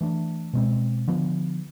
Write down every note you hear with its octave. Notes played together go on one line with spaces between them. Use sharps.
E3 A3 D4
B2 G#3 C4
D3 F3 B3